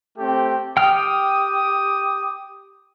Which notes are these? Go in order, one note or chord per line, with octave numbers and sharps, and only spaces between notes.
A3 C4 G4
G4 G5 D6 D#6 F6